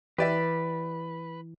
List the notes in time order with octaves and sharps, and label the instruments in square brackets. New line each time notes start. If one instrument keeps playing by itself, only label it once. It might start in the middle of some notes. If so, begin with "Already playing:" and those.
[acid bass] E3 [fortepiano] G4 D5 E5 [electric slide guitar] B4